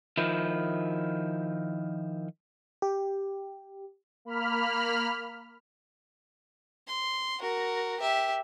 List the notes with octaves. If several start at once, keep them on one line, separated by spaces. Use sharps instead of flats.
D#3 F3 E4
G4
A#3 B5 F6
C6
F#4 A#4
G4 E5